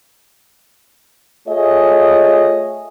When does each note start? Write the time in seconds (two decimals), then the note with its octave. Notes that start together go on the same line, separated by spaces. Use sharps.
1.48 A3 F4 G#4 C#5 D#5 E5